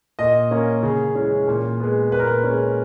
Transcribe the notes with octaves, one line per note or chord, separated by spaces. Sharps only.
A#2 D#5
A#3 C#4
C#3
E3 G#3 C#4
A#2
G#3 B3
A#2 B4
A#4
B4
G#3 C#4